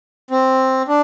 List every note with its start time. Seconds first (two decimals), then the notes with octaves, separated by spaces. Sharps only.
0.31 C4
0.88 D4